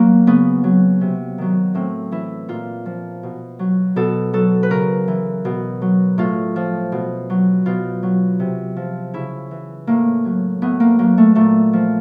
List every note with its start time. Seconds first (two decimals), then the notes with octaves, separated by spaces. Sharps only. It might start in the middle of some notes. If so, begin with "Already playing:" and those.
Already playing: F#3 A#3
0.27 C#3 B3
0.64 F#3
1.01 C3
1.38 D#3 F#3
1.74 A2 C4
2.12 E3 E4
2.48 A#2 F4
2.86 F3
3.23 B2
3.59 F#3
3.96 B2 A4
4.33 F#3 A4
4.63 B4
4.70 C#3 A#4
5.08 E3
5.45 B2
5.81 F#3
6.18 A2 F4
6.56 F3
6.92 B2
7.30 F#3
7.66 B2 F4
8.03 F#3
8.40 C3
8.76 F3
9.13 C#3 E4
9.51 E3
9.87 A2 A#3
10.25 F#3
10.62 A2 B3
10.80 A#3
10.99 F#3 A#3
11.18 A3
11.35 A#2 A3
11.73 F3